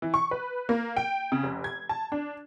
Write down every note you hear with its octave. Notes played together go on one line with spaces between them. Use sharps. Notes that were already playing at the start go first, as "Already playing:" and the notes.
E3
C#6
B4
A#3
G5
C#3
F1
G#6
A5
D4